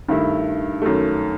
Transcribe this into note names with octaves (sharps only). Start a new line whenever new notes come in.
G2 D#3 A3 E4
F#2 D#3 A3